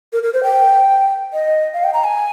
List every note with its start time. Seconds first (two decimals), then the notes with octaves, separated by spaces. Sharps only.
0.13 A#4
0.23 A#4
0.34 C5
0.43 G5
1.33 D#5
1.74 F5
1.84 G5
1.94 A#5
2.04 G#5